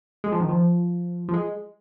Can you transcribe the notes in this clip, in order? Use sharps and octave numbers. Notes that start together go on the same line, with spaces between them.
G#3
F3
D#3
F3
F3
G#3